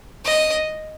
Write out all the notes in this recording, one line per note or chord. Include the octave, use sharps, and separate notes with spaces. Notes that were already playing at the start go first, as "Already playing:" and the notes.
D#5